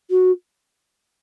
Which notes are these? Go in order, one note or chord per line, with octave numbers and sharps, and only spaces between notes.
F#4